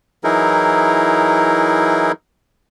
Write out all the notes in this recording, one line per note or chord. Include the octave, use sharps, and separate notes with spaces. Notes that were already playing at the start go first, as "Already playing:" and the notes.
E3 F#3 D#4 E4 G#4 A#4